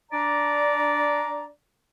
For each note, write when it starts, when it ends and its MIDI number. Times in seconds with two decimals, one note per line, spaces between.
0.11 1.46 62
0.11 1.46 74
0.11 1.46 82